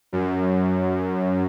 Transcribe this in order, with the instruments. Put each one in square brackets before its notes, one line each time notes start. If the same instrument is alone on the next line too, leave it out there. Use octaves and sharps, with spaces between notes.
[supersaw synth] F#2